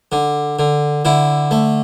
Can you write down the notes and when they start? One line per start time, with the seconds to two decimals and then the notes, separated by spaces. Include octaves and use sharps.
0.12 D3
0.59 D3
1.05 D3 E4
1.51 A3